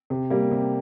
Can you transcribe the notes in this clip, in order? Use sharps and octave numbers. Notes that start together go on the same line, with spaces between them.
C3
G3 A#3
C3